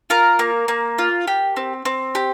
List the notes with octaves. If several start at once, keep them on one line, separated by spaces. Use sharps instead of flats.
F4 A#4
A#3
A#3
F4
G4
C4
C4
G4